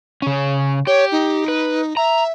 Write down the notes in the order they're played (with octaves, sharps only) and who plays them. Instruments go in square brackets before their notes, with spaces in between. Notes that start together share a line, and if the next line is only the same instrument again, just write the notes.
[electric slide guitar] C#3 C#4
[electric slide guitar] G4 [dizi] C#5
[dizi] D#4
[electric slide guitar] B4
[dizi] E5 [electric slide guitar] A#5